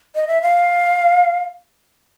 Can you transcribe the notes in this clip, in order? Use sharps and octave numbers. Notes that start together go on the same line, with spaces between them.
D#5
E5
F5